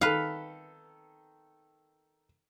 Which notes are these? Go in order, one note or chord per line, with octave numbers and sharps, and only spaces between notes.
D#3 A4 B4 F5